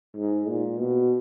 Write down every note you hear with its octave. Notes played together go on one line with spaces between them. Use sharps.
G#2
A#2
B2